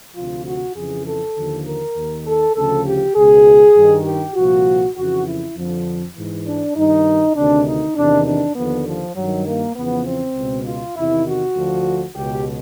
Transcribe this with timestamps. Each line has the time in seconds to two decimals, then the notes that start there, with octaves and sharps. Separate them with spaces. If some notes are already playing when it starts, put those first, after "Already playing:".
0.15 D2 C3 F3 F4
0.45 F#4
0.75 F2 C#3 E3 G#4
1.06 A4
1.36 D#2 D3 F3
1.66 A#4
1.96 D#2 D#3
2.27 A4
2.55 D2 C#3 F3 A4
2.87 G4
3.15 C#2 B2 G#4
3.76 G2 D#3
4.05 G4
4.35 C2 A#2 F3 F#4
4.97 F2 C#3 E3 F#4
5.26 E4
5.56 F2 D3 F3
6.16 G#2 E3
6.47 D4
6.76 G2 D#3 D#4
7.36 D2 C3 D#3 D4
7.67 D#4
7.96 E2 C3 D#3 D4
8.26 D4
8.55 D#2 D3 F3 B3
8.86 F3
9.15 G2 D#3 F#3
9.46 A#3
9.75 E2 C#3 F3 B3
10.06 C4
10.36 C#2 B2
10.66 F4
10.96 E2 C3 D#3 E4
11.27 F#4
11.55 D2 D3 F3
12.16 C#2 B2 G4